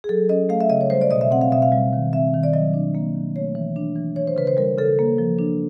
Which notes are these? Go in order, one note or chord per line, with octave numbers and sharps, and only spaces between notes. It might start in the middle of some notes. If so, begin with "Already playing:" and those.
G#4
F#3 A4
C#4 D#5
A3 F5
E5
C#3 D#5
C#5
G3 C5
D5
B2 D#5
E5
C4 F#5
F5
B2 E5
F5
G3
D#3
C4 E5
D#3
D5
F#3 D#5
D4
A#3
D#3
A3 C#5
E3
D4
E3
E3 C#5
C5
C#3 B4
C5
G3 A#4
C#3 A4
A#3
F3
D4